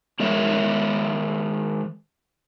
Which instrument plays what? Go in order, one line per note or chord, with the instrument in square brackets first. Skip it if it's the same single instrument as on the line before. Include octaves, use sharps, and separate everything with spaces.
[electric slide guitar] D#3 G#3 A#4 C#5 D#5 E5